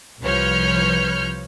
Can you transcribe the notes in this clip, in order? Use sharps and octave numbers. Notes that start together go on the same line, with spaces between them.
C2 F3 B4 C#5 F6 G6